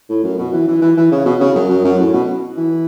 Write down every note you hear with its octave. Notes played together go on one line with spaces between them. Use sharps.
A2
F#2
B2
E3
E3
E3
E3
C#3
B2
C#3
F#2
F#2
F#2
A2
B2
E3